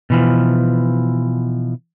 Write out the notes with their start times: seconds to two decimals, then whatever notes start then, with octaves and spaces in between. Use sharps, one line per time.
0.10 B2 E3 F3